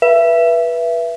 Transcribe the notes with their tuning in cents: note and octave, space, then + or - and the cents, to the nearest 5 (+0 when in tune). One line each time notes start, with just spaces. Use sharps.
B4 -20 E5 +25